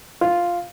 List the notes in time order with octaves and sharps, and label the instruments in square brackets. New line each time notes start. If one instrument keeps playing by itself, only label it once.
[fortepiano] F4